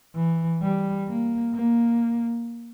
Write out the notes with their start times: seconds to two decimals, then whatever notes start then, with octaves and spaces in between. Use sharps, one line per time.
0.15 E3
0.62 G3
1.08 A#3
1.54 A#3